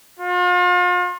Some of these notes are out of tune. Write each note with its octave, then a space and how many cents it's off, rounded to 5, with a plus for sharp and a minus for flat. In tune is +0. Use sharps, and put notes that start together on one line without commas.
F4 +40